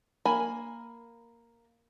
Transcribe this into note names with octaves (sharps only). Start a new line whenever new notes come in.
A#3 G#5 B5